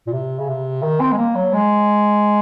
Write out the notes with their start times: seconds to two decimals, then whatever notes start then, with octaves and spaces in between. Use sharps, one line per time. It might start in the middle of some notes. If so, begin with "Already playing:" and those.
0.07 A#2
0.13 C3
0.39 C#3
0.48 C3
0.82 D#3
1.00 C4
1.12 G#3
1.17 A#3
1.35 F#3
1.53 G#3